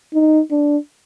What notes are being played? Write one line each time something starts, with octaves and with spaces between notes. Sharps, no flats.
D#4
D4